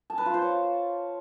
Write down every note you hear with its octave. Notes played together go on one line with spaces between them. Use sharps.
A5
B4
F4
C5
C#5